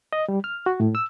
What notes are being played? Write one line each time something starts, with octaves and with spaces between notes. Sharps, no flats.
D#5
G3
F6
F#4
A2
E6